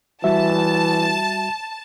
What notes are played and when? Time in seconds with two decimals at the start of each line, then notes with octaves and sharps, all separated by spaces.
0.24 E3 G3 F#4 E5 A5